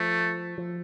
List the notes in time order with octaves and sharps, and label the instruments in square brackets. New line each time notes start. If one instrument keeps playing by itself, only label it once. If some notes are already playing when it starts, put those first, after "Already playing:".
Already playing: [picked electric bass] F3 [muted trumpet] A3
[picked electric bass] F3